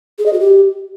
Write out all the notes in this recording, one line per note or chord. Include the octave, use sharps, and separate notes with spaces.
G#4
D#5
F#4
G4